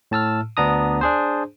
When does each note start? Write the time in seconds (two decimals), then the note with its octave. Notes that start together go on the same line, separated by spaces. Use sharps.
0.11 A2 A5 E6 F6
0.57 D2 B3 D4 A#5 D#6
1.01 D4 G#4 C5